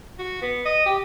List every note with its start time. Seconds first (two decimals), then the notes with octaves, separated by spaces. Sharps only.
0.19 F#4
0.42 B3
0.65 D#5
0.86 G4